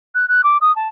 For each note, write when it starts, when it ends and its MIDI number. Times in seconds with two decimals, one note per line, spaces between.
0.15 0.28 90
0.28 0.42 90
0.44 0.57 86
0.61 0.74 87
0.76 0.88 81